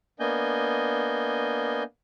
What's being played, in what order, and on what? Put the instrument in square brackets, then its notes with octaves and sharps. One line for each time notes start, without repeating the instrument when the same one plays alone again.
[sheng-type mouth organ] A#3 B3 D4 D#5 G#5 G6